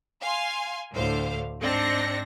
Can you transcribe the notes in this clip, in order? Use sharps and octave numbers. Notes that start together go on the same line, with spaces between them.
F5 G#5 C6
D2 A2 D3 C5 F5
G#2 C4 D4 A#6 C#7